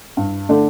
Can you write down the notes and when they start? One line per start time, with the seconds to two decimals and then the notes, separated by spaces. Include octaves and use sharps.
0.17 G2
0.49 D3 A3 D4